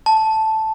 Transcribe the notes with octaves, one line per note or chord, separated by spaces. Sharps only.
A5